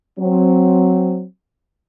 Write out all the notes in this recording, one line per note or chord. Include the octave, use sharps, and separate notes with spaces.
F#3 C4